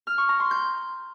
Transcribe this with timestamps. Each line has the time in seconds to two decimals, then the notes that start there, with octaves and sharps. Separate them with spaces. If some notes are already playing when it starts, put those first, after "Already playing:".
0.07 F6
0.18 C#6
0.29 A#5
0.40 C6
0.51 G6